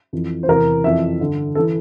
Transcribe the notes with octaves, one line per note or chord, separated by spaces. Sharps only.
F2 E3
C5
E2 C3 E3 A#4
F2 E3 E5
G2 D3
A4
E3